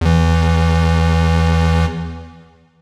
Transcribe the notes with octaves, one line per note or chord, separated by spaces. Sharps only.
E2 E3